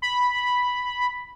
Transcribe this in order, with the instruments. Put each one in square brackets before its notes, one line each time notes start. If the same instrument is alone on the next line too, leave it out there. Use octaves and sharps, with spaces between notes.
[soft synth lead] B5